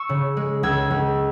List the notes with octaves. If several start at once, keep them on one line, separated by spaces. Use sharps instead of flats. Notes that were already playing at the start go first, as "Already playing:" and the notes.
Already playing: C#6 E6
C#3
G#3
C#2 E6 G#6
C#2